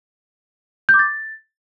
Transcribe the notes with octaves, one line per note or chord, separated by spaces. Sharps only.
G6
D6
A6